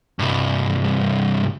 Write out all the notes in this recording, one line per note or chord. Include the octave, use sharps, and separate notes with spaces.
C2 G2